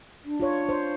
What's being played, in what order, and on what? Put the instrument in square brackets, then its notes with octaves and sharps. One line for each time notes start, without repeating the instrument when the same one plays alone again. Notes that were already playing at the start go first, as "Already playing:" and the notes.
[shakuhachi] D4
[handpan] F4 C#5
C5